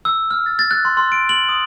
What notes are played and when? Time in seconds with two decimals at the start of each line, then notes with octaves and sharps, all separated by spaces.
0.05 E6
0.31 F6
0.46 A6
0.59 A6
0.71 F#6
0.85 C6
0.97 C6
1.12 D7
1.29 F#7
1.49 D#6